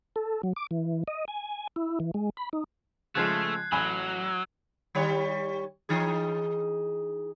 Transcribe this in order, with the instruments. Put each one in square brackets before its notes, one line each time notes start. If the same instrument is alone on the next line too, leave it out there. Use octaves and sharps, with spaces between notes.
[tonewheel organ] A4
F#3
D6
E3
D#5
G#5
E4
E3
G#3
B5
D#4
[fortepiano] C#3 F3 G#3 [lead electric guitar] A3 [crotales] F#6 G#6 C7
[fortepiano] A1 G#5 B5 [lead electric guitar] F#3
[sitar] D#3 G3 C#5
E3 D#4 G#4